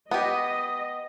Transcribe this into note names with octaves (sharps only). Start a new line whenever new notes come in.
B3 G4 D#5